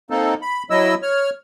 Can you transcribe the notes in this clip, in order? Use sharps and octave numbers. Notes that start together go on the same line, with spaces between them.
A#3 C4 D#4 A4
B5
F#3 E4 D#5 E6
C#5 F6